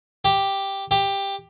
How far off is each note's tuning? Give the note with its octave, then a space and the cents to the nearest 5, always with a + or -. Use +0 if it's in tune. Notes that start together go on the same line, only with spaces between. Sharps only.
G4 +0
G4 +10